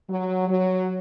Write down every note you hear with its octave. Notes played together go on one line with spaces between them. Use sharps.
F#3
F#3